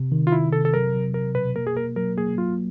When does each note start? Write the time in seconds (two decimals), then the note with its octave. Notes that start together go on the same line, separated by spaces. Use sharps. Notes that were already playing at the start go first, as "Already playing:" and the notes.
Already playing: C3
0.12 D#3
0.27 F4
0.32 D#3 E4
0.52 C3 A4
0.65 A4
0.74 F#3 A#4
0.94 F#3
1.14 F#3 A#4
1.35 B2 B4
1.56 A#3 A#4
1.67 G#4
1.76 A#3 A#4
1.96 F#3 A#4
2.17 A#3 G#4
2.37 F#3 F4